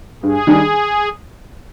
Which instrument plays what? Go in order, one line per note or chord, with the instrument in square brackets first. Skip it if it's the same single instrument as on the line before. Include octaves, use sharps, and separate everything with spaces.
[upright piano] G2 [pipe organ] G#4
[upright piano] D#3 G3 D4